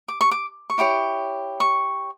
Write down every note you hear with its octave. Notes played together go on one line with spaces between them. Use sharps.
D6
C#6
D6
C#6
E4 G4 C#5 D6
C#6